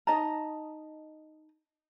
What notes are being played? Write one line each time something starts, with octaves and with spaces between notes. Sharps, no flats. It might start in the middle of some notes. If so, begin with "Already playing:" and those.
D#4 D#5 A5 A#5